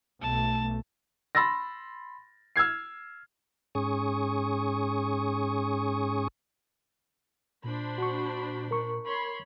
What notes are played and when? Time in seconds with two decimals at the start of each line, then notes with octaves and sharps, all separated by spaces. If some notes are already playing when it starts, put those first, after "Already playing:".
0.22 B1 A3 A5
1.35 B5 C6 E6 A6 A#6
2.56 E6 F6 G#6 C7
3.75 G#2 C#4 G#4 C#6 D#6
7.64 A#2 D4 C5 B5
7.98 F#4 C#6
8.71 A#4 C#6
9.06 C#5 B5 C6